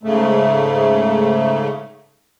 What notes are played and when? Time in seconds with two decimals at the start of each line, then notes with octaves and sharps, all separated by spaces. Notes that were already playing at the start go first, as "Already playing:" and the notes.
0.03 G#2 C#3 A3